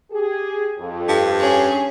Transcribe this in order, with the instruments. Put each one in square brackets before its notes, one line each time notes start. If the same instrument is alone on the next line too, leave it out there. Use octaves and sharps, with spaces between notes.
[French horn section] G4 G#4
F2
[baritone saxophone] G2
[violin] C#4 G#4